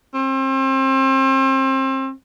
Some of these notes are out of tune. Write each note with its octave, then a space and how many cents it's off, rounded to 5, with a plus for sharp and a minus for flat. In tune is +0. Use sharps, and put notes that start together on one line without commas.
C4 +35